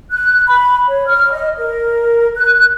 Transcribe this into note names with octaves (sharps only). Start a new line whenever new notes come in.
F#6
B5
C#5
F6
D#5
A#4
F#6